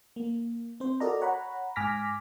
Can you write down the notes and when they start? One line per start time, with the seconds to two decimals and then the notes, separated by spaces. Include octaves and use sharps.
0.16 A#3
0.80 C4 C5
1.00 F#4 A4 A#4 D5 D#5 A#5
1.21 C#5 F#5 A#5 B5
1.76 G#2 G#5 D6 F6 A#6 B6